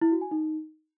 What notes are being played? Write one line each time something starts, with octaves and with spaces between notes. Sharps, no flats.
E4
F#4
G#5
D#4